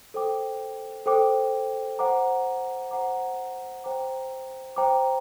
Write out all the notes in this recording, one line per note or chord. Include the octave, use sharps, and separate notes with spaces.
A4 C5 G5 D6
A4 C5 G5 D6
C5 F#5 A#5 D6
C5 F#5 A#5 D6
C5 G5 A#5 D6
C5 G5 A#5 D6